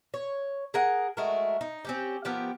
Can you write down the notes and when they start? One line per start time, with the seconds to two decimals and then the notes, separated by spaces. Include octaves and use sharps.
0.14 C#5
0.74 G#4 A#4 F#5
1.17 G#3 A3 F#4 A#4
1.61 D#4
1.85 C4 C#4 G4
2.25 F3 B3 G4 A#4